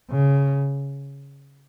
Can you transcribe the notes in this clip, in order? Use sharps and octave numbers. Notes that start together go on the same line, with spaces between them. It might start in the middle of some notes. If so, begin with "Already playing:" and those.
C#3